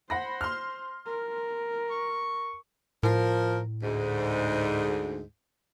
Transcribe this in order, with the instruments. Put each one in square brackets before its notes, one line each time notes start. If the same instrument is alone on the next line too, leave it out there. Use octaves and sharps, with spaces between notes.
[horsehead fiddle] C5 [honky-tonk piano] F#5 B5 A#6
[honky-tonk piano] C6 F6
[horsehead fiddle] A#4
[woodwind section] C#6
[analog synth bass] A2 [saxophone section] F3 A#4
[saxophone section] D2 G#2